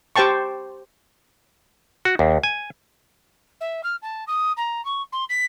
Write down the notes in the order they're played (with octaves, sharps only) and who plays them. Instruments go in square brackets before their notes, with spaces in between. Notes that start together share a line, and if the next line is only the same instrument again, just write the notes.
[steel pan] G4 C5 G5 A5 C#6
[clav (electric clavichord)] F#4
D#2
G#5
[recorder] E5
F6
A5
D#6
A#5
C#6
C6
B6